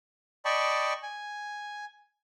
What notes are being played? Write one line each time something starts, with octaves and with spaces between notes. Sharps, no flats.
D5 D#5 G5 A5 B5 C#6
G#5